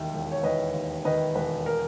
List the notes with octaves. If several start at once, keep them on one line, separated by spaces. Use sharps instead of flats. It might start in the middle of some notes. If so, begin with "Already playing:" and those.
Already playing: E1 D#2 D#3 E5 G5
E1
C#5
E1 B4 D#5
D#2
D#3 B4 D#5
E1 B4
A#4